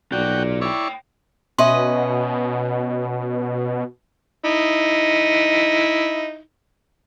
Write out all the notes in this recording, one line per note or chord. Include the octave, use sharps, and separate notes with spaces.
B1 F4 F#4 D5 G5
E4 C#5 D5 G5 C#6
B2 C#4 B4 D#5 E5 C6
D#4 E4